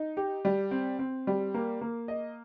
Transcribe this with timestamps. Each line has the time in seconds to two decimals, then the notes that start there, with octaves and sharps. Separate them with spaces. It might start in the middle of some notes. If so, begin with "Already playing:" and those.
Already playing: D#4
0.17 G4
0.45 G3
0.71 C4
0.99 C4
1.27 G3
1.54 A#3
1.81 A#3
2.08 D#5